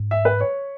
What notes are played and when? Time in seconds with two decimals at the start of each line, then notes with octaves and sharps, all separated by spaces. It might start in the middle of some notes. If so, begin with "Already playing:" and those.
Already playing: G#2
0.11 E5
0.25 B4
0.40 C#5